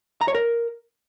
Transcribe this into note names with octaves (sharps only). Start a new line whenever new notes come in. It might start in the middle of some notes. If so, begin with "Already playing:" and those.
A#5
C#5
A#4